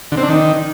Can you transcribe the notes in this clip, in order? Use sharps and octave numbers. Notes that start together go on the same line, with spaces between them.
D3
C4
D4
D#3